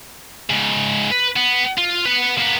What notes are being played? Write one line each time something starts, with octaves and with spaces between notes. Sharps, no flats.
G#2 C#3
B4
B3
F4
B4 F#5
A#3 B3